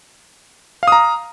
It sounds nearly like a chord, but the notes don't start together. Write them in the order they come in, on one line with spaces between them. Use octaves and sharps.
F5 D#6 A#5